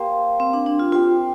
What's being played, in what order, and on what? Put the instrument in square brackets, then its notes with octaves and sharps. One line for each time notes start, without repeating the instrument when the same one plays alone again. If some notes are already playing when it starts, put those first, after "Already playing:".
Already playing: [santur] A#3 G4 C5
[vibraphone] C4
D4
D4
F4
[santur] C4 G4 C5 [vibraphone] F4